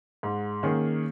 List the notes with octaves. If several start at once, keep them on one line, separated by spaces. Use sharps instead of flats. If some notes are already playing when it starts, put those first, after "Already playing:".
G#2
D#3 A#3 C#4 G#4